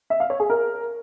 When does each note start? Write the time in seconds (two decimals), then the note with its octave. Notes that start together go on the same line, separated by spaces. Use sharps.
0.10 E5
0.20 F5
0.30 C#5
0.40 G#4
0.50 A#4